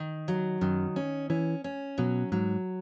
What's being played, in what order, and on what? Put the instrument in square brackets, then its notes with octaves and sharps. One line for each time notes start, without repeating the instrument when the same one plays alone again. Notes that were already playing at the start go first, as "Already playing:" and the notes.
Already playing: [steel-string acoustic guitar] D#3
F#3
[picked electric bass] F#2 [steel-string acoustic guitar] D#3
[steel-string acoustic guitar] C#4
[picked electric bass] E3 [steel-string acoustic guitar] C#4
[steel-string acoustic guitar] C#4
[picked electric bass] B2 [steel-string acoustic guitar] F#3
[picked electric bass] G#2 [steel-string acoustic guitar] F#3